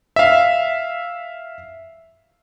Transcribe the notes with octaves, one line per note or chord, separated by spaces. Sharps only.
E5 F5